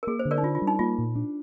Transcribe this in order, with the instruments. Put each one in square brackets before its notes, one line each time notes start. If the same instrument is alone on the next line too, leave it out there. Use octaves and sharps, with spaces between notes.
[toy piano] A#4
[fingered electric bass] A#3 [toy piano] G#4
[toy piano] C5
[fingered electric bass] D3
[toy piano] A#4 D5
D#4
[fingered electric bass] D4 [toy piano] F4
[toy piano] F4
[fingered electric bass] G3
[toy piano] D#4
[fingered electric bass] A#3 [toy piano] F4
[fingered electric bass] A#2
D4